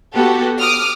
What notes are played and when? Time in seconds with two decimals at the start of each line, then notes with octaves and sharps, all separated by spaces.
0.14 B3 F#4 G4 A4
0.60 D6 D#6 F6